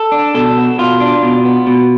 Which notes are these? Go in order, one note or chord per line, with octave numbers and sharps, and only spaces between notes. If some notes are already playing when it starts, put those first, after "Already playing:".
Already playing: A4
D4
B2 A4
B3
B2 F4
D4
B2
B3
B2